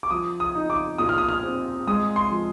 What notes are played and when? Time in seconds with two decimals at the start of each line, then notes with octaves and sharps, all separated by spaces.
0.03 D6
0.11 F3 D#6
0.40 D#6
0.55 D#4
0.70 D6
0.98 A#2 D#6
1.09 F6
1.18 D#6
1.28 F6
1.43 C4
1.87 G#3 D#6
2.16 C6
2.31 F3